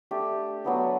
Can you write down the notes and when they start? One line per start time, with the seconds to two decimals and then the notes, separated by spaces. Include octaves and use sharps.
0.11 A3 D4 G4
0.64 F#3 B3 D4